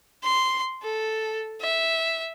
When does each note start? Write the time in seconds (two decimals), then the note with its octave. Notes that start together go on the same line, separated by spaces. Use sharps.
0.23 C6
0.83 A4
1.62 E5